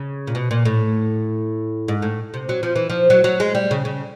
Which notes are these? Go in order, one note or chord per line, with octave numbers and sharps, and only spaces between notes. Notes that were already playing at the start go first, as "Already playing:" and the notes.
Already playing: C#3
A#2
B2
A#2
A2
G#2
A2
C3
F#3
F3
E3
F3
F#3
F#3
G#3
G3
C#3
C#3